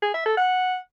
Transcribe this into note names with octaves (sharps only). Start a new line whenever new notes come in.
G#4
E5
A4
F#5